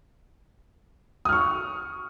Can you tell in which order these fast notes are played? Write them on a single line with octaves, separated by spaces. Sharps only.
D#6 F6 C#6